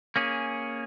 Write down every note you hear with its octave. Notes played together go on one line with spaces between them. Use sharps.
A#3 C#4 G#4